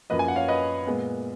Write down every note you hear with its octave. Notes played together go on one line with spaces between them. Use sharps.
F#2 F3 A#3 B4 D#5
G#5
F#5
C#5 F5
B4 D#5
A#2 G#3 B3